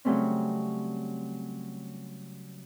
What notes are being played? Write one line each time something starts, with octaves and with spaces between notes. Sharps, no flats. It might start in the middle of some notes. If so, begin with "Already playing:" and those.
C#3 F#3 G3 A3 C4 C#4